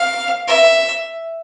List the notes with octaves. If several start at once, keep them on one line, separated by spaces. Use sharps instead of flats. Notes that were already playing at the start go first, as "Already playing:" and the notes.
Already playing: F5
E5